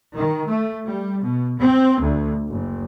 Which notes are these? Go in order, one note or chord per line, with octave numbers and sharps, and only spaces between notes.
D#3
A3
G3
B2
C4
D2
F#1